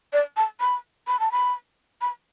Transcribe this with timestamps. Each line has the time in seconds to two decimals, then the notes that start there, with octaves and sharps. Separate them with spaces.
0.13 D5
0.37 A5
0.60 B5
1.07 B5
1.20 A5
1.32 B5
2.01 B5